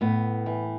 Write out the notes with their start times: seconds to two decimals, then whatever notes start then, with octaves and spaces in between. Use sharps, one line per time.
0.01 A2 B3
0.46 E3